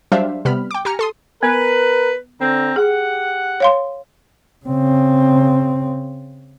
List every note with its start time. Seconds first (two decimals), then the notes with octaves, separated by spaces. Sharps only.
0.12 F#3 G3 D4 C5 E5 F5
0.45 C3 G3 B3 B5 F6
0.71 G5 D6
0.85 G4 G#5 A#5 F6 C#7
0.99 A4 C6 D#6
1.43 B3 A#4 B4
2.40 D3 C4 A#5
2.76 G4 G#4 F#5
3.60 C#5 F5 C6
4.65 C#3 C4